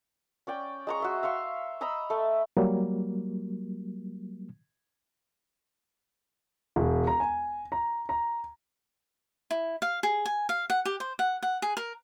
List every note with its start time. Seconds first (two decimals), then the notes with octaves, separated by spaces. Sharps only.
0.47 C#4 D5 G5
0.87 G#3 A#5 C#6
1.00 F#4 E5 C6
1.23 E5 F5 C6 C#6
1.81 D#5 A#5 B5 E6
2.10 A3 A4
2.57 F#3 G3 A#3
6.76 E1
7.07 A#5
7.20 G#5
7.72 A#5
8.09 A#5
9.51 E4
9.82 F5
10.03 G#4
10.25 G#5
10.49 F5
10.70 F#5
10.85 G4
11.00 C5
11.19 F#5
11.43 F#5
11.62 G#4
11.77 A#4